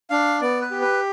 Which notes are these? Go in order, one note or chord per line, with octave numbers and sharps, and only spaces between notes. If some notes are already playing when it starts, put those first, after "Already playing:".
D4 F5
B3 D5
B4
G4
B4